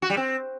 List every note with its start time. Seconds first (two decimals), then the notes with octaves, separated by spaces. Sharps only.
0.02 F#4
0.10 G3
0.17 C4